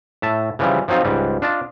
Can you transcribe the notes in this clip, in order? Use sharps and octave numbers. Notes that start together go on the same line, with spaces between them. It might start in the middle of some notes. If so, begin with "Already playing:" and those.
A2 E5 A5
C#3 E3 F3 G3
F3 F#3 C4 D#4 F4
C#2 G#2 G3
D4 F4 D#5 A5